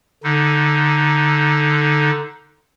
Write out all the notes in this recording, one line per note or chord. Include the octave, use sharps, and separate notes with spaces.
D3 D#4